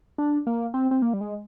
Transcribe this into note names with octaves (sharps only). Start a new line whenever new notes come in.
D4
A#3
C4
C4
A#3
G3
G#3